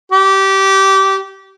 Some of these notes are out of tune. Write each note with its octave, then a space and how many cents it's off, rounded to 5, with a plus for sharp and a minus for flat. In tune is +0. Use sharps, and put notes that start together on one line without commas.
G4 -20